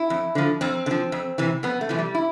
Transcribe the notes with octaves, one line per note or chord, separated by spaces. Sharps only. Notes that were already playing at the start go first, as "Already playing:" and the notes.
Already playing: E4
F2
D3 F3
F2 C4
D3
F3
F2
C3 E3
F2 B3
A3
C3 E3 F3
G3
E4